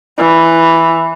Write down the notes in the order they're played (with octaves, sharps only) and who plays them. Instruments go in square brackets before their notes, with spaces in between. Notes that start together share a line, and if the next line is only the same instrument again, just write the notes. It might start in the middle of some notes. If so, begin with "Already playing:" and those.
[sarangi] E3